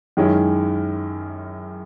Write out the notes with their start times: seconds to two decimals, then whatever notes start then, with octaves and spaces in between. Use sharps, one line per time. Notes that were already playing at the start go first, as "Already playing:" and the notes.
0.17 F#2 D#3 G#3 C#4 E4